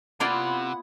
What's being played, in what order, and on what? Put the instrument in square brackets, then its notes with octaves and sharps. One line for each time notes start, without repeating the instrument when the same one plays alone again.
[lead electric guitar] C3 [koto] A#3 F4 D5 [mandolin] B3 E4 [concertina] F#5